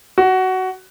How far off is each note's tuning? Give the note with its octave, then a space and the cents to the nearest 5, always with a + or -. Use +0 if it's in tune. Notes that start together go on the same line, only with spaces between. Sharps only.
F#4 +15